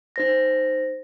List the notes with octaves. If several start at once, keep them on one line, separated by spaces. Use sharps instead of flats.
D#4 C5 A#6